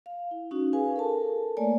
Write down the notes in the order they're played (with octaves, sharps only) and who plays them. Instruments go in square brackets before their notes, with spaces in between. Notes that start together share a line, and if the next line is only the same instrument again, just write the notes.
[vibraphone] F5
E4
C#4 D#4 F#4
G#4 B4 F5 G#5
A4 A#4 A5
A3 A#3 C#5 D5 G#5 A5